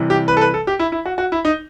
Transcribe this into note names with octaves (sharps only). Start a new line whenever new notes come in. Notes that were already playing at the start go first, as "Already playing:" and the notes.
Already playing: C3 E3 G3
G4
B4
A4
B4
A4
G4
E4
E4
F#4
F#4
E4
D#4